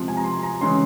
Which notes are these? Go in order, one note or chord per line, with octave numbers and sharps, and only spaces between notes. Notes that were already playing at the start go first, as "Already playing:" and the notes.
Already playing: C3 F3 G#3
G#5
A#5
C6
A#5
C#3 E3 G#3 C#4 C6